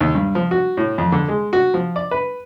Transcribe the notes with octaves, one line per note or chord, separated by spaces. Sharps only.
D#2
G2
F3
F#4
A2
F2
D3
G#3
F#4
F3
D5
B4